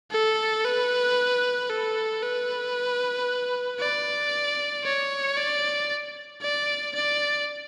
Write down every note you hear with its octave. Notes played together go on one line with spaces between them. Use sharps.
A4
B4
A4
B4
D5
C#5
D5
D5
D5